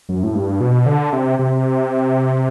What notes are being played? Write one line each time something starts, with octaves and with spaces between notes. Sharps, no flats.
F#2
A2
G2
B2
D3
C3
C3